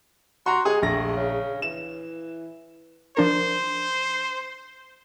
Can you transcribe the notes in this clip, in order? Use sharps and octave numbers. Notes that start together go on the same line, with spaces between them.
F#4 A#5 C6
G#3 G#4 D#6
A#1 A3 A#6
C#3
E3 E7
F3 D4 A#4 C5